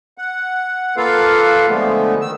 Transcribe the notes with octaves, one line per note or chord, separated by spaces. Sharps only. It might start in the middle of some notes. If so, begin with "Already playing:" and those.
F#5
A#3 F4 A4 B4 F5
D3 F3 G#3 A3 B3
D#3 E6